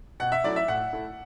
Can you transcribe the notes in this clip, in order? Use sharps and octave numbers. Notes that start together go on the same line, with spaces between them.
B2 F#5
E5
F#3 A3 E4 D5
E5
A2 F#5
A3 E4